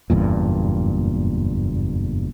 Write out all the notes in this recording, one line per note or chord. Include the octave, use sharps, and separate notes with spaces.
F#1 E2 G2 A#2